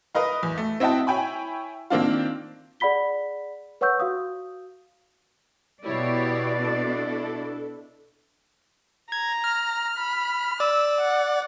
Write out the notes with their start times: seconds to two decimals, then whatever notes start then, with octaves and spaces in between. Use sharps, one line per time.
0.15 A#4 B4 D#5 F5
0.43 E2
0.57 A3
0.80 C4 E4 D#5 F#5 G5 A5
1.07 E4 C#5 G5 G#5 B5
1.90 D#3 A#3 C4 D4 F4
2.80 G#4 D5 F#5 B5 B6 G7
3.81 B4 C#5 F#5 C#6 E6 G6
4.00 F#4 F5 D#6
5.83 B2 E4 G4 C#5 D5
6.59 D4 E4 A4
9.12 A#5 G#6
9.44 F6
9.97 B5
10.60 D5 E6
11.00 F#5